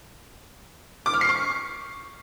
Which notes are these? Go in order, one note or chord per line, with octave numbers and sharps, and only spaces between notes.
D6
F6
C7
C#6